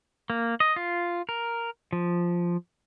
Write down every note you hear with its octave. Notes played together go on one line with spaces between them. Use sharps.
A#3
D#5
F4
A#4
F3